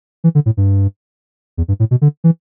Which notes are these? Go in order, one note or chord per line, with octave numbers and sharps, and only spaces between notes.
E3
D3
A2
G2
E2
G2
A2
B2
D3
E3